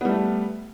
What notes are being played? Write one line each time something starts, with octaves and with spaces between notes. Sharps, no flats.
G3 A3 B3